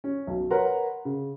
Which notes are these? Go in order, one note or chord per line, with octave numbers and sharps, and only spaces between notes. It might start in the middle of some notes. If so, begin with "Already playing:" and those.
C#4
B1
A#4 B4 C#5 F#5 A#5 C6
C#3